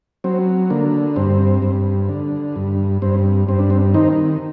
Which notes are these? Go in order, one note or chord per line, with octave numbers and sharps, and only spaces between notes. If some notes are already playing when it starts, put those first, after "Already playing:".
F#3 C4
D3 A#3
G2 C4
G2
D3
G2
G2 C4
G2 C4
D4
C4
D#3 C4 D#4